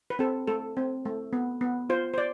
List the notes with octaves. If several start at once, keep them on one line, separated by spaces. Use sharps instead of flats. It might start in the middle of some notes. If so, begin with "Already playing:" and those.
B4
C4 A4
A3 A4
C4
A3
B3
B3
F4 C5
C5
D5